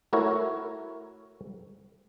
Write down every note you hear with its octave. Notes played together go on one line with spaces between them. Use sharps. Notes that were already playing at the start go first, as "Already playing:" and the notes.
A3 E4 F#4 A#4 C#5